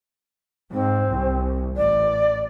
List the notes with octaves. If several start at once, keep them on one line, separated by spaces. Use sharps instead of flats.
G#2 C4
C2
A1 D5